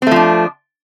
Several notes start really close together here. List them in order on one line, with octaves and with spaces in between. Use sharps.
C4 A3 F3 D4